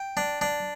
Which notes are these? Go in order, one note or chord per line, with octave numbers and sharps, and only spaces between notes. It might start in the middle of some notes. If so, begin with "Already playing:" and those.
Already playing: G5
D4
D4